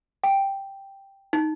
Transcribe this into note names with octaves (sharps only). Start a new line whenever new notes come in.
G5
D#4